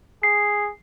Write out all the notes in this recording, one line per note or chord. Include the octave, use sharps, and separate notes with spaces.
G#4 C7